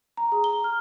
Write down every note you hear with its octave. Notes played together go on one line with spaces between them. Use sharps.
A#5
G#4
G7
F6